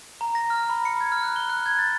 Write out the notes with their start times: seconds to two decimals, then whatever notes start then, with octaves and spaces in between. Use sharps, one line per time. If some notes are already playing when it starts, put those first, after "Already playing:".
0.21 A#5
0.35 A#6
0.50 F6
0.70 B5
0.85 C#7
1.01 G#6
1.12 F6
1.23 F#6
1.36 G7
1.50 F#6
1.66 G#6
1.78 A6